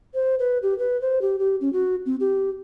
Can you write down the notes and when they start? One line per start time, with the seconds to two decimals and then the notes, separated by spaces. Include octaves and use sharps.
0.14 C5
0.39 B4
0.62 G4
0.78 B4
1.01 C5
1.21 G4
1.39 G4
1.61 C#4
1.73 F#4
2.06 C4
2.20 G4